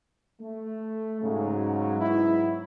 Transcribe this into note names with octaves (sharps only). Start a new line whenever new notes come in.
A3
G#2 C#3 F#3
G#2 F#3 B3 E4